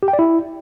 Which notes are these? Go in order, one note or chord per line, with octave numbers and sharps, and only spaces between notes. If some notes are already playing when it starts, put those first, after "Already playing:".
G4
G5
D5
E4